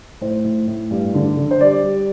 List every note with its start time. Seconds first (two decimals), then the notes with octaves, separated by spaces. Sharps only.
0.21 A2 C5
0.44 A2
0.67 A2
0.91 G2
1.14 D3
1.37 D3
1.51 C5
1.60 G3 D5
1.83 G3